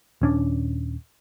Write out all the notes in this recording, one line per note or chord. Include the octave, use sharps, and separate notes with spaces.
D#1 C#4 D4